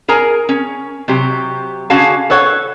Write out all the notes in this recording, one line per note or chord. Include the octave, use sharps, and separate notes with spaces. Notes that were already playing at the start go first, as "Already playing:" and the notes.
G#4 A#4 G#5 A#5
C#4
C3 F#3 G4
D3 C#4 F#4 G#4 F5 A5
A4 B4 C#5 F#5